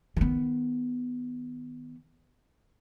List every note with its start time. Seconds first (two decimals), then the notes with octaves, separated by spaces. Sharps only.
0.16 D#3 B3